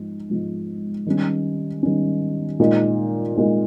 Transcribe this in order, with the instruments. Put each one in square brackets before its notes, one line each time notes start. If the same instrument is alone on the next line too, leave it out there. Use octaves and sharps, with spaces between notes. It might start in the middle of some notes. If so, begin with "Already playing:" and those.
Already playing: [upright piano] G#2 F3 G#3
G#2 F3 G#3
D#3 G3 C#4
D#3 G3 C#4
A#2 G#3 D#4
A#2 G#3 D#4